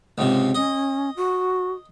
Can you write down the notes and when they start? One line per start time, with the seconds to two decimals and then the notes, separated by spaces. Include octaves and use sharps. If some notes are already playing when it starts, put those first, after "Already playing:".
0.18 C#2 G#2 C3
0.55 C#4 D#5
1.17 F#4